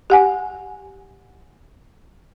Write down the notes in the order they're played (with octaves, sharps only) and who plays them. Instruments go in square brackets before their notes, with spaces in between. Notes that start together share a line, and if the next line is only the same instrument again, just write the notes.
[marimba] G4 F#5 G#5